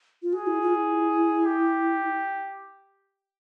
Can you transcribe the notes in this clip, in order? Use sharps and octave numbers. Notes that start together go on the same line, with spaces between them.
F4
F#4 G#4
E4
F4
E4
G4